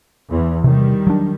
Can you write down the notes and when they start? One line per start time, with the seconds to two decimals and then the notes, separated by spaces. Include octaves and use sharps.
0.30 E2 E3
0.64 C3 D#3 G3
1.07 F#3 D4